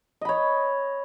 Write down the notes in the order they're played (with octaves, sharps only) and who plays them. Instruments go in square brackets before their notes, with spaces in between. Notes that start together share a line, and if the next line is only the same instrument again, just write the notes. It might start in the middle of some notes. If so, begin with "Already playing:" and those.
[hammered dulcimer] D#5
B5
C#5